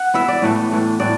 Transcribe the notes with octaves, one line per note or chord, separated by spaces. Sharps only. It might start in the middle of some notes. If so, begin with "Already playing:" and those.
Already playing: F#5
E3 B3 E4 E5
D5
A2 E3 A3
A2 E3 A3
A2 E3 D5